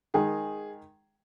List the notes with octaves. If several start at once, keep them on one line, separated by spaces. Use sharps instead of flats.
D#3 G#3 D#4 G#4